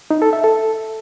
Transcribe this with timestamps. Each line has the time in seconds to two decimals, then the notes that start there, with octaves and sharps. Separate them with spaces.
0.11 D#4
0.22 A4
0.33 E5
0.44 A4